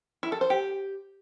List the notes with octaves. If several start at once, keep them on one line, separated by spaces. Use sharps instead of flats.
E4
A4
C5
G4